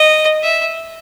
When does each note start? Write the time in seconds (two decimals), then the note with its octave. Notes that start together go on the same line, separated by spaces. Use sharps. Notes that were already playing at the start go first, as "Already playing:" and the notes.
Already playing: D#5
0.43 E5